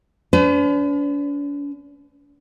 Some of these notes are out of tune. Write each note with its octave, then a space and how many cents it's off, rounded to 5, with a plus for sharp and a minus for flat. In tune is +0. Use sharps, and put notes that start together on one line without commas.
D4 -45 B4 +45